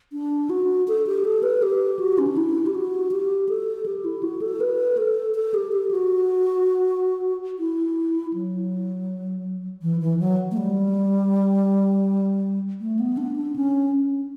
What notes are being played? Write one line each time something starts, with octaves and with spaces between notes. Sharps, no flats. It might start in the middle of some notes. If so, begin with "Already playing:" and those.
D4
F#4
A4
G4
A4
B4
G4
F#4
C#4
D4
E4
G4
F#4
G4
A4
G4
E4
F#4
A4
B4
A4
A4
G4
G4
F#4
E4
F#3
E3
E3
F#3
A3
G3
A3
B3
D4
D4
C#4